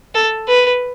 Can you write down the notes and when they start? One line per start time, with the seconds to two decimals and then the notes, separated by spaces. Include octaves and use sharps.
0.15 A4
0.48 B4